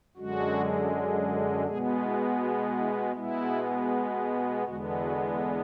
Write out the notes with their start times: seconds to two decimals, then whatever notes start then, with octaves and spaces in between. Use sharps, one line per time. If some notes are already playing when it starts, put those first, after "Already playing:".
0.17 F#2 D3 G#3 F#4
1.66 B2 G#3 B3 G#4
2.04 E4
2.41 F#4
2.78 E4
3.15 B2 G#3 B3 E4
4.65 E2 D3 G#3 B3 F#4
5.02 F#4